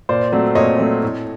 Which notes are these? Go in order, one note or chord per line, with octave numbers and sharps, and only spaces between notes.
A#2 C5 D5
F#3 A3 C4
A#2 C#5 D#5
F#3 A3 C4
A2